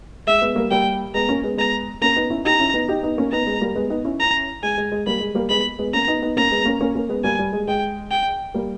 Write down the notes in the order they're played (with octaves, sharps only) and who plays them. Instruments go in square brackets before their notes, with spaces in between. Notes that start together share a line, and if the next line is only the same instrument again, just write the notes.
[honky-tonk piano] G#3 [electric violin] E5
[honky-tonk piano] G#3 B3
G3 A#3
[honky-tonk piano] G3 A#3 [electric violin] G5
[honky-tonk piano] G#3 B3 [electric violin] A#5
[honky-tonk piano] A#3 C#4
G#3 B3
[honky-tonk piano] G#3 B3 [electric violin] A#5
[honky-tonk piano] A#3 C#4 [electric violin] A#5
[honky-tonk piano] B3 D#4
C#4 E4
[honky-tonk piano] D#4 G4 [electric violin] A#5
[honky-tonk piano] C#4 E4
B3 D#4
D#4 G4
B3 D#4
A#3 C#4
[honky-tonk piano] B3 D#4 [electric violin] A#5
[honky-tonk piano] G#3 B3
G3 A#3
G#3 B3
B3 D#4
C#4 E4
[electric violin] A#5
[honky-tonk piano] G#3 [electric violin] G#5
[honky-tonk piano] G#3
G#3
[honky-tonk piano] G3 A#3 [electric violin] B5
[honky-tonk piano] G#3
G3 A#3
[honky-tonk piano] G#3 B3 [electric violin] B5
[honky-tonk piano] G#3 B3
[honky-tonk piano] A#3 C#4 [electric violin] A#5
[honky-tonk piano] B3 D#4
B3 D#4
[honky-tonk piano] A#3 C#4 [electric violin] A#5
[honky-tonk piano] G#3 B3
A#3 C#4
A#3 C#4
A#3 C#4
G#3 B3
[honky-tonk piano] G3 A#3 [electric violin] G#5
[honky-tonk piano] G3
G#3
[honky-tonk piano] G#3 [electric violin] G5
[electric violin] G5
[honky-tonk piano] G3 A#3